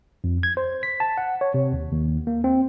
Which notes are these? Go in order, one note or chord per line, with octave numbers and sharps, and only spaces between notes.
F2
G#6
C5
B6
A5
F#5
C#5
C3
D#2
D#2
A#3
C4